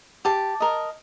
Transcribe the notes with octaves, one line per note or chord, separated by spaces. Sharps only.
G4 A5
A#4 D#5